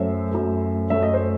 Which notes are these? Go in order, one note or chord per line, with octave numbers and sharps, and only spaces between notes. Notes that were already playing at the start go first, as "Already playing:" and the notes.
Already playing: F#2 F#3 A3 C5 E5
F#2 F#3 A3
F#2 F#3 A3 E5
D#5
C5